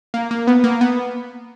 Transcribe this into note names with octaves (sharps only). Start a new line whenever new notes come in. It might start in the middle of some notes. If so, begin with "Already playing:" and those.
A#3
A#3
B3
A#3
B3